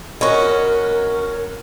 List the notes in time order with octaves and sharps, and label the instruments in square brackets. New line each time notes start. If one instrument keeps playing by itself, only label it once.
[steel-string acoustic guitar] C#4 F#4 [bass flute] A#4 [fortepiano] D#5 C#6